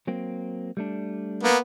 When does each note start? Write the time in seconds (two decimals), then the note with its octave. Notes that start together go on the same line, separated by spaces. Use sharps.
0.07 F#3 A#3 C4
0.77 G3 A3 D4
1.43 A#3 B3